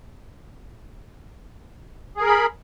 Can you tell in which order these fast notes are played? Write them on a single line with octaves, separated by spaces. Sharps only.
G#4 A#4 B5